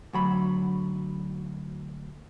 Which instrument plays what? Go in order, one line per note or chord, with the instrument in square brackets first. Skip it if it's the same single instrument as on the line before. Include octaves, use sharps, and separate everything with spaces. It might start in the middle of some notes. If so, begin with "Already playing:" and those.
[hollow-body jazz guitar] D2 F#3 B5